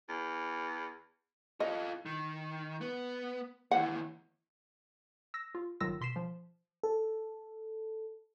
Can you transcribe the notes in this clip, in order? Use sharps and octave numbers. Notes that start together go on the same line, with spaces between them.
E2
F4 A4 D#5
D#3
B3
D#2 E3 F#5
E6 A#6
F4
G1 D#3 F#3 F4 E6 A#6
B2 C6 B6 C7 E7
F3
A4